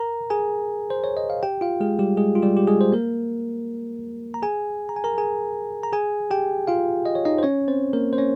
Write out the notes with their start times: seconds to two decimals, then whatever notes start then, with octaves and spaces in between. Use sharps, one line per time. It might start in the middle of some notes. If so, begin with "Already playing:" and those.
Already playing: A#4 A#5
0.30 G#4 G#5
0.90 C5
1.04 C#5
1.17 D#5
1.30 F5
1.43 G4 G5
1.61 F4 F5
1.81 G#3 G#4
1.99 G3 G4
2.17 G#3 G#4
2.35 F4
2.42 G3 G4
2.57 G4
2.67 G#3 G#4
2.81 C5
2.92 A#3 A#4
4.34 A#5
4.42 G#4 G#5
4.89 A#5
4.96 G#5
5.04 A#4 A#5
5.18 G#4 G#5
5.83 A#5
5.92 G#4 G#5
6.31 G4 G5
6.68 F4 F5
7.06 D#5
7.15 C#5
7.25 D#4 D#5
7.38 C5
7.43 C#4 C#5
7.68 C4 C5
7.93 A#3 A#4
8.13 C5
8.18 C#4 C#5